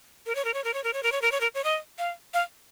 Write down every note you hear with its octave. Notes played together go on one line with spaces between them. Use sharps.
A#4
C#5
A#4
C#5
A#4
C#5
A#4
C#5
A#4
C#5
A#4
C#5
A#4
C#5
D#5
F5
F5